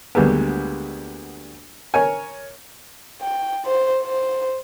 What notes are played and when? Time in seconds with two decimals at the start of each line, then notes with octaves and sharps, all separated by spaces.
0.15 D2 G3 G#3 A#3 B3
1.94 A#4 C#5 G#5
3.21 G5
3.65 C5
4.03 C5